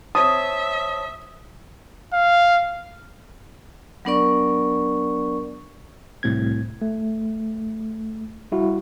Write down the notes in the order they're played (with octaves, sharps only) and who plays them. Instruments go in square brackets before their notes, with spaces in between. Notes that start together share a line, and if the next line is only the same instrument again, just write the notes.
[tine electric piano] C5 C#5 A5 [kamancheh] E5 [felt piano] D#6
[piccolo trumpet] F5
[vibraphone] F#3 B3 D4 A#4 D5 C#6
[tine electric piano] C2 A2 C4 G#6
A3
G3 E4 F#4